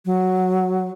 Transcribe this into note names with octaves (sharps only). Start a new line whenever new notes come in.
F#3